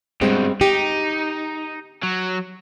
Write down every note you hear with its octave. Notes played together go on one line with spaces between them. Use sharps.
G2 B2 G3 G#3 C4
D#4 G4
F#3